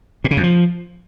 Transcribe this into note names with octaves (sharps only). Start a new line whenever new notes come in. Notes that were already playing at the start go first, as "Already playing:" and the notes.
A#2
C#3
F2
F3